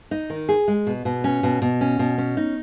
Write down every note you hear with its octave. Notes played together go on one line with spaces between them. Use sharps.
D#4
D#3
G#4
G#3
B2
B2
C#4
B2
B2
C#4
B2
C#4
D#4